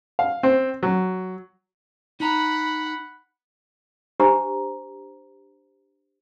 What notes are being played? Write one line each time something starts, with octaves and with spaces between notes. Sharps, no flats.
F5
C4
F#3
D#4 F#5 A#5 B5
D4 G4 C5 A#5 C#6